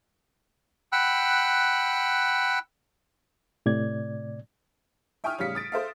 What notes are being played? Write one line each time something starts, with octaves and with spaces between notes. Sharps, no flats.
F#5 G5 B5 E6 F#6
A2 C3 D5 G#6
E5 G5 G#5 C#6 D#6 F6
A1 C#3 G3 F5 B6 C#7
D#6 A6 D7
A4 C5 E5 F5